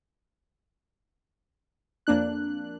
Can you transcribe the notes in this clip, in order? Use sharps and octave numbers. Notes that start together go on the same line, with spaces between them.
F2 A#3 D4 F#6